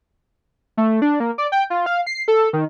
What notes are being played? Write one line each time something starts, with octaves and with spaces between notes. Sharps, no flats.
A3
D4
A#3
D5
G5
F4
F5
C7
A4
D#3